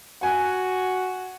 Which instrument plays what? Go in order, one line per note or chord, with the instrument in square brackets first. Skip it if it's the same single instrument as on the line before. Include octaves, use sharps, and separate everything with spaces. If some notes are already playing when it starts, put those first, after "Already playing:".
[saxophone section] F#4 [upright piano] F#5 G#5